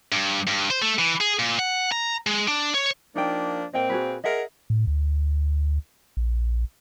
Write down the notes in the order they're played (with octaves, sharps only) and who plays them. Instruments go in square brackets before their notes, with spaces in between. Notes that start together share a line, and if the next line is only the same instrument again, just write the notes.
[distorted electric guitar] G2
G2
C5
A3
E3
G#4
A#2
F#5
A#5
G#3
D4
C#5
[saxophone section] F3 A#3 D4 [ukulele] D#4 G5
[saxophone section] A#2 A#3 C4 [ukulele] D#5 G5
[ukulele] F#4 G#4 B4
[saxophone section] G#4 A#4 [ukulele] D#5 E5 F#5
[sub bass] A2
D2
A#1